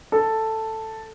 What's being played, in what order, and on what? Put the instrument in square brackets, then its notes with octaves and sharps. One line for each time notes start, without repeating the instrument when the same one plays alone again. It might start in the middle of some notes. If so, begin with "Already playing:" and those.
[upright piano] A4